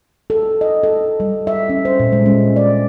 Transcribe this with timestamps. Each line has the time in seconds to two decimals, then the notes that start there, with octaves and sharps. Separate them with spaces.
0.30 A4
0.61 D#5
0.83 A4
1.20 G3
1.47 E5
1.70 C#4
1.85 C5
2.00 A#2
2.12 G#3
2.26 C#4
2.56 D5